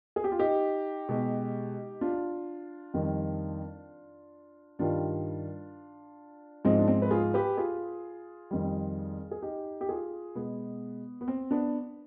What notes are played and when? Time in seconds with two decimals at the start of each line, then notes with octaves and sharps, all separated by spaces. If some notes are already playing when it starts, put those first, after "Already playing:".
0.16 G#4
0.24 G4
0.32 F4
0.39 D#4 G4
1.09 B2 G#3
2.01 D4 F4
2.94 F2 D#3 G3
4.79 G2 D#3 G3 D4 F4
6.65 G#2 F3 G#3 C4 D#4
6.79 D4
6.88 C4
7.02 B4
7.11 F4 G#4
7.34 G4 B4
7.57 F4 G#4
8.51 F2 D#3 G3
9.31 G#4
9.42 D#4 G4
9.81 G4
9.89 F4 G#4
10.35 B2 G#3 B3
11.21 B3
11.28 C4
11.51 B3 D4